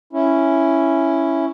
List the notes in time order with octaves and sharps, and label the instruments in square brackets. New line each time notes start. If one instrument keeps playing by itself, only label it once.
[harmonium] C#4 E4